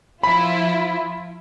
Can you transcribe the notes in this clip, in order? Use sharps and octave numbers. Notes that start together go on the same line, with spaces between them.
F3 E4 F4 B5